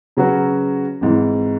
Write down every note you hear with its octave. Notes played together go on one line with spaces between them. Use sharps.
C#3 F#3 C#4 F#4 B4
G#1 G#2 E3